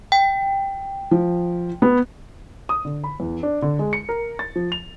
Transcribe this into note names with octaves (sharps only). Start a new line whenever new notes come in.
G5
F3
B3
D#6
D3
B5
E2
D4
D3
G#3
C#7
A#4
A6
F3
F7